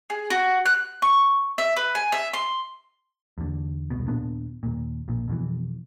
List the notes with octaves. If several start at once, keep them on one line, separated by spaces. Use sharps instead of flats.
G#4
F#4
F#6
C#6
E5
B4
G#5
E5
C6
E2 D3
E1 C2 B2
D#2 A#2 B3 D4
D#2 A#2
A#1 A#2
F2 B2 D#3 E3